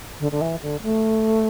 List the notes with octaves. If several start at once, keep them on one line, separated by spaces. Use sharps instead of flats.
D3
D3
E3
D3
A3